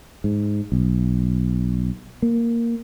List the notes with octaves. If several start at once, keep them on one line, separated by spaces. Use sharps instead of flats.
G#2
B1
A#3